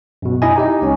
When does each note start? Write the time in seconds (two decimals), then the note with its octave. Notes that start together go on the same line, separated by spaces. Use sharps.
0.22 F#2 B2
0.42 D#4 E4 D#5 G#5
0.56 D#4 G4 D#5
0.82 C#2 C#4